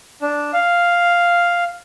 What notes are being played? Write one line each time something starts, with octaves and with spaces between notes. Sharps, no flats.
D4
F5